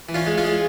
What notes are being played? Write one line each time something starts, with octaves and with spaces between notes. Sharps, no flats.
E3
C#4 F4
G#3
C#4 F4
G#3